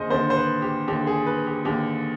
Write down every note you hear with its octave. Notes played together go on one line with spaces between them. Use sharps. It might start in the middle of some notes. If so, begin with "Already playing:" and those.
Already playing: D#2 D3 G#4 C5 D#5
D#2 D3 C5
C5
B4
G4
D#2 D3 G4
G#4
B4
G4
D#2 D3 G4